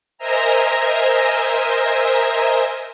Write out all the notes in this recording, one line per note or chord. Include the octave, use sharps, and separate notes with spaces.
A#4 C5 D#5 E5 G#5 A#5